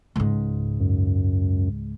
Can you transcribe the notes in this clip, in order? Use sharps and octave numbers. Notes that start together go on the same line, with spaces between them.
C#2 G#2
F#2